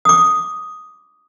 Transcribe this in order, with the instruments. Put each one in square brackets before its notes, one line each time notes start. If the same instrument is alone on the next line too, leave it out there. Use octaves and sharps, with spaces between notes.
[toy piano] D6 D#6